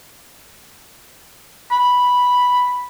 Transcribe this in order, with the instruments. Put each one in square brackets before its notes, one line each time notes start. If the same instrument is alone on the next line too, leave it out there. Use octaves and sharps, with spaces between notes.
[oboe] B5